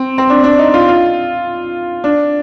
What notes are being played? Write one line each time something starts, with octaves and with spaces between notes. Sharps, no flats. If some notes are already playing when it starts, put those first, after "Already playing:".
Already playing: C4
C4
D4
D4
D#4
F4
F4
D4